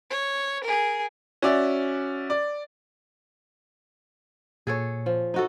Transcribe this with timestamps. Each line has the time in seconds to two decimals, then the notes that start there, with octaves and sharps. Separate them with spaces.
0.10 C#5
0.64 G#4 A#4
1.42 C#4 F#4 D5 E5
2.30 D5
4.67 A#2 G#4 A4 C#5
5.06 F3
5.34 D#4 F#4 A4